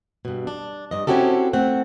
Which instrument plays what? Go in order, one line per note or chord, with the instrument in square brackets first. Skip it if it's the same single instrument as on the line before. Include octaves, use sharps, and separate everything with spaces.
[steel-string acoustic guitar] G2 B2
D4
G2 D#5
C4 C#4 E4 F#4 G4 A4
A3 C4 F#5